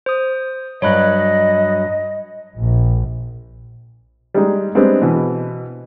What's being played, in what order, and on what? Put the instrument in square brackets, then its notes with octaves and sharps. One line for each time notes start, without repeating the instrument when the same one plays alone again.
[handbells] C5 D#6
[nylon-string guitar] G2 F#3 [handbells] C#5 B5 F#6 [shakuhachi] D#5
[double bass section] A#1
[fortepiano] G3 G#3 D#4
G3 G#3 B3 C4 D4
B2 E3